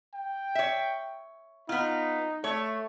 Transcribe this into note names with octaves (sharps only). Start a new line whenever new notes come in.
G5
C#5 E5
B3 D#4 F4
A3 C#5